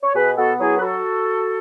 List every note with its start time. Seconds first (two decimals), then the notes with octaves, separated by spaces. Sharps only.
0.03 C#5
0.14 B2 G#4 B4
0.37 B3 F#4 A4
0.59 F#3 E4 G#4
0.78 B4
0.81 F#4 A4